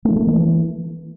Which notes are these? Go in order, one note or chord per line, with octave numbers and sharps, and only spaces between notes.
A3
F3
A3
A#3
E3